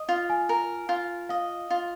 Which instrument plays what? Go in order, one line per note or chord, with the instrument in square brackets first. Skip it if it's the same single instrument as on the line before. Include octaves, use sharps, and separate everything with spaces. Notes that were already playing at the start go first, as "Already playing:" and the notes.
Already playing: [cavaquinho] D#5
F4
[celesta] G#5
[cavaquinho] A#4
F4
[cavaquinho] D#5 [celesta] F5
[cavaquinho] F4